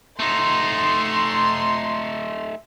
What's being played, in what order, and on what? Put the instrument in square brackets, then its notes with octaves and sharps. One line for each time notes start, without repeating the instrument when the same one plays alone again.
[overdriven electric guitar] A3 D#4 [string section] C6